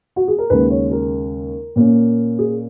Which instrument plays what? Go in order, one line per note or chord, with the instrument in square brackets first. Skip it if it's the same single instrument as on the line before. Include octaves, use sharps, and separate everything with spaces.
[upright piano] F#4
G#4
A#4
D#2 C#3 G#3 B4
C#5
A#4
A#2 A#3 C#4
G#4